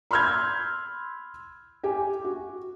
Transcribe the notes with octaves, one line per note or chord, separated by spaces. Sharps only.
B5 C6 E6 F6 G6 G#6
G4 G#5
F#4